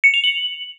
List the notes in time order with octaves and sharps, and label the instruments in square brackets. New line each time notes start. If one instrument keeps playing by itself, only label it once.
[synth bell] C#7
F7
F#7